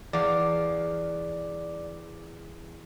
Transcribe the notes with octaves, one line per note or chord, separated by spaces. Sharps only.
E2 D5 F5 D6